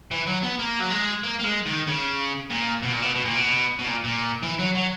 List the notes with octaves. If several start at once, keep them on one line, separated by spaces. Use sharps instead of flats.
E3
F#3
B3
A#3
F#3
G#3
A#3
A#3
G#3
D#3
C#3
A#2
B2
A#2
B2
B2
A#2
B2
B2
A#2
A#2
E3
F#3
F#3